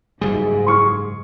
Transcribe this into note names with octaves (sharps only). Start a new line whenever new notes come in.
F#1 G#2 G3 G#4
C6 C#6 F6